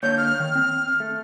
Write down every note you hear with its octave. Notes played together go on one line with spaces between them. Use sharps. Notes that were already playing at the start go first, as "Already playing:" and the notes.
D3 A#3 C#5 G6
F6
D#3
C4
A3